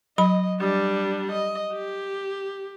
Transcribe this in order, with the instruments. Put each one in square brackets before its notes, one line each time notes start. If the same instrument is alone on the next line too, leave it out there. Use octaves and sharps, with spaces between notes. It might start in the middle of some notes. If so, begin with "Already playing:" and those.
[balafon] F#3 B5 [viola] D#5
[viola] G3 D4
D#5
G4